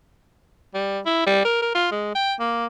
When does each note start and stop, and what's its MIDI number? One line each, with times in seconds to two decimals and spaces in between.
0.74 1.00 55
1.05 1.22 64
1.27 1.44 55
1.45 1.60 70
1.62 1.70 70
1.75 1.88 65
1.91 2.14 56
2.15 2.34 79
2.40 2.66 58